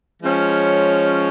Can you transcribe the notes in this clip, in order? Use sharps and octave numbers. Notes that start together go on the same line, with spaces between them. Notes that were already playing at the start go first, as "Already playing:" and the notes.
F3 G#3 C#4